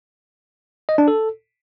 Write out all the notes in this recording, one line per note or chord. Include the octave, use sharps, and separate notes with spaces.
D#5
D4
A4